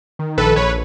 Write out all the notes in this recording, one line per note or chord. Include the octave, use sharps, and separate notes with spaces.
D#3
A#1 A4 B4
A#1 B4 C#5